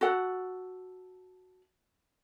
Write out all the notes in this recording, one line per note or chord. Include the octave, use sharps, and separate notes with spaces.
F#4 A4 F#5